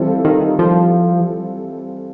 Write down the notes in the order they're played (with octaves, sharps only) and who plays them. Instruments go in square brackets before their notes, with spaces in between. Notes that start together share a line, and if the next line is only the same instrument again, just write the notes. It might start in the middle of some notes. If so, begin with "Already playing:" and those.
Already playing: [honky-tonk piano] E3 G3 C4 F4 A4
[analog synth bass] D#3
F3